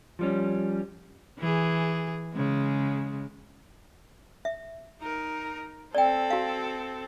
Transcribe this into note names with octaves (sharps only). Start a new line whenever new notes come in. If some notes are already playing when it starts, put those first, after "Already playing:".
F3 G3 C#4
E3 G#4
C#3 G#3
E5
D#4 A#4
C4 A4 D5 G5
F#4 F5